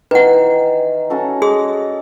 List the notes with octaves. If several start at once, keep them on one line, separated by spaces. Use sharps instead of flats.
D#3 E3 B4 F#5
C#4 F#4 A4
G#4 D#5 C6 D#6